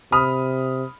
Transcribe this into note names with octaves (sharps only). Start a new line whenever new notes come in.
C3 B5 D#6 F6